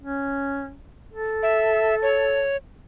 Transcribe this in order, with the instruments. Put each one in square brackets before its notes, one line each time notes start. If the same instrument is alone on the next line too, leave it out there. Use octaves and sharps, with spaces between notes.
[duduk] C#4
A4
[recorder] E5
C#5